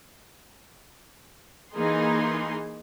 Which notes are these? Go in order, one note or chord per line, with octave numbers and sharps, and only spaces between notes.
E3 A#3 D#4 G#4 C6